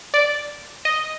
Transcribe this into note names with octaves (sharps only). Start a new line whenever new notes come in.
D5
D#5